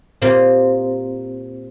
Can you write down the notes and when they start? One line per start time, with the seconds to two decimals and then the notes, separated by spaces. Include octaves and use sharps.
0.22 A#2 A#3 C4 G4 A#4 D#5